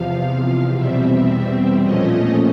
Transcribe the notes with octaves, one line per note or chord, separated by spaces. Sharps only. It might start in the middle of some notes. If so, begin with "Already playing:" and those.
Already playing: E2 C3 F3 F5
E2 B2 G3 C4 E5
A#2 F3 A3 C#4 D#5